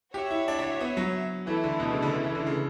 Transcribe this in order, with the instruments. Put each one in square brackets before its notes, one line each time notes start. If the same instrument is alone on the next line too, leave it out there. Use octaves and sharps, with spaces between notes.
[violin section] F#4 C#5 E5 [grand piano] G4
[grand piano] E4
D4
D4
B3
F#3
[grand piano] E3 [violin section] A3 E4 B4
[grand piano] D3
B2
C#3
D3
C#3
E3
D3
C#3